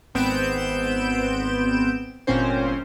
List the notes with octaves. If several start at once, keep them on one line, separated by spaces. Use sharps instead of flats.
G#1 B3 C4 G6 D7 E7
G1 A#2 C4 C#4 C5